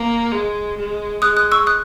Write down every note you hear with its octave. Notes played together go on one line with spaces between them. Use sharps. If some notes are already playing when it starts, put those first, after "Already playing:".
Already playing: A#3
G#3
G#3
G#3 D#6 F#6
D#6 F#6
C#6 E6
D#6 F#6